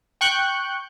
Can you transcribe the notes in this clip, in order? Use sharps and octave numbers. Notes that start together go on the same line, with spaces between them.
G5 C#6 F#6 G6